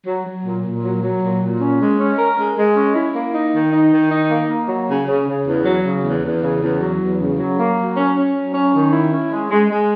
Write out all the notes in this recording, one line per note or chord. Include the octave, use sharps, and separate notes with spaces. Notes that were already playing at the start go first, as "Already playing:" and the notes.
F#3
F#3
A#2
A#2
F#3
F#3
A#2
A#2
C#4
G#3
C#4
A#4
G#3
G#3
C#4
E4
A#3
D#4
D#3
D#4
D#3
D#4
A#3
A#3
F#3
C#3
C#3
C#3
E2
F#3
C#3
E2
E2
C#3
E2
F#3
E2
C#3
F#3
A#3
F#3
C#4
C#4
F#3
C#4
D#3
E4
C#4
G#3
G#3
G#3